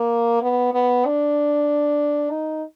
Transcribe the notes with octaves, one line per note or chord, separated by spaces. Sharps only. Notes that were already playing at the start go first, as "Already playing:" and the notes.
Already playing: A#3
B3
B3
D4
D#4